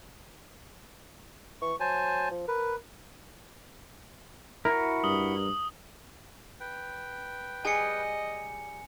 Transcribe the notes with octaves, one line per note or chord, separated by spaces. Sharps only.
E3 C#6
F#3 C5 G#5 A5
F3
A#4 B4
E4 F#4 A#4
G2 D#6 F#7 G7
B4 G5
G3 G#4 D#5 G#5 C#7